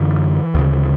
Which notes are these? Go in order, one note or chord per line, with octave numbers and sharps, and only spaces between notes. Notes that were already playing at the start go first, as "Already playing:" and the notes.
Already playing: F#2 D3 E3
D2 C#3